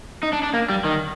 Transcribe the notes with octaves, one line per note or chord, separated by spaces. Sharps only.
D#4
D4
D4
A#3
G3
D#3